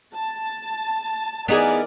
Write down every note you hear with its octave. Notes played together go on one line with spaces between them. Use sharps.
A5
E3 B3 D#4 G#4 A#4 D5